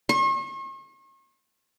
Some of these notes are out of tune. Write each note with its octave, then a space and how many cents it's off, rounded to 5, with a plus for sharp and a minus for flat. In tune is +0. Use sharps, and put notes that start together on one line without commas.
C#6 -45